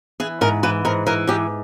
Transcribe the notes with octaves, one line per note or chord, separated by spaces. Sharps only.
E3 G#4
G#2 A#4
E3 B4
G#2 A#4
E3 A#4
G#2 G4